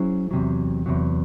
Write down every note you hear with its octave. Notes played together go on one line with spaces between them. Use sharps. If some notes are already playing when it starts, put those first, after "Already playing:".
Already playing: F#3 C#4 E4 G#4 C5
E2 C3 F#3
E2 C3 F#3